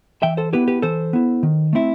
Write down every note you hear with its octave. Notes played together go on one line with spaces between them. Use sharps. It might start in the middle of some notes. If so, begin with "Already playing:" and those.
E3 E5 G5
A4 C5
B3 E4 G4 B4
G4 B4
E3 A4 C5
B3 E4
D#3
A3 C4 E4